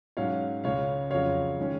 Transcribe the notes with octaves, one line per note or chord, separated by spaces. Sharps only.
G#2 F#3 C#4 C#5 F5
C#2 C#3 G#3 C#5 F5
F2 C#3 F#3 C#5 F5
D#3 G#3 C#4